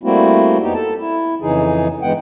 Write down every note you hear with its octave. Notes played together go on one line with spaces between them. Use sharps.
G3 A3 A#3 C4 E4 F#4
F2 B3 D#4 G4
A4 A5
E4
F2 C#3 E3 D#4 G#4
G2 E3 G#3 B3 F#5 G5